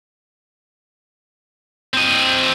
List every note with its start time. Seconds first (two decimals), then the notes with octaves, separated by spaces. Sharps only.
1.94 C4 D#5